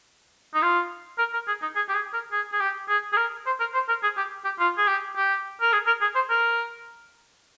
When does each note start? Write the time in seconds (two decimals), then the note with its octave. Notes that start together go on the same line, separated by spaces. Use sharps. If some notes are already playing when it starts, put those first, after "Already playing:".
0.54 D#4
0.62 F4
1.19 A#4
1.33 A#4
1.47 G#4
1.62 D#4
1.75 G#4
1.89 G4
1.95 G#4
2.14 A#4
2.32 G#4
2.52 G#4
2.60 G4
2.89 G#4
3.13 G#4
3.17 A#4
3.46 C5
3.60 A#4
3.74 C5
3.88 A#4
4.03 G#4
4.17 G4
4.44 G4
4.59 F4
4.78 G#4
4.87 G4
5.16 G4
5.61 A#4
5.73 G#4
5.87 A#4
6.01 G#4
6.15 C5
6.30 A#4